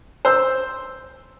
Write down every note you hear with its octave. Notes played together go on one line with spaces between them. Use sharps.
C5 E6